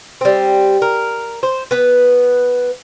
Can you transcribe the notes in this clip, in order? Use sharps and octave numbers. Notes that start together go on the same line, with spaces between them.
G3 C4
A#4
C5
B3 B4